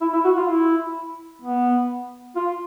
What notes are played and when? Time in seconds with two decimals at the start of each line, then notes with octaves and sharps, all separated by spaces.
0.01 E4
0.13 E4
0.24 F#4
0.37 F4
0.47 E4
1.42 B3
2.36 F4